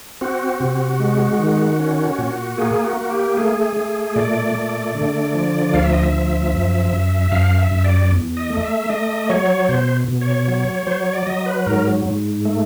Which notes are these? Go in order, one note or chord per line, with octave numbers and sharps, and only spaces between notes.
C4 F#4
C3
G#3
D#3
C#4
A#2
A#3 G#4
F#4
A#3
G4
A3 G#4
A3
A#2 D5
A3
D3
F3
D2 F5
E5
D#5
E5
F3
F#2
F#2
F#2 F5
E5
F#2
D5
E2
D#5
A3
E5
A3 D#5
F#3 C#5
B2 C5
B2
C#5
F#3
F#3 C5
C#5
D5
F#3 D#5
B4
G#2 A#4
G#2
A3